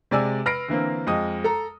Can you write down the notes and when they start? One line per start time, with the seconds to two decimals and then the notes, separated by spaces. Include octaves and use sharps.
0.11 C3 G#3 D5 G#5 E6
0.46 B4 F6 A#6 C7 D7
0.68 D3 E3 A#3 C4
1.07 F2 G#3 D#5 D#6
1.44 A4 A#5